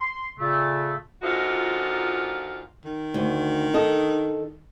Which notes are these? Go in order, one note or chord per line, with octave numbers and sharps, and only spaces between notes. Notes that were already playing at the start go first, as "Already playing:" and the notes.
C6
A#2 C#3 A3
A#2 D3 F3 D#4 F4 F#4
D#3
D2
D#4 A4 D#5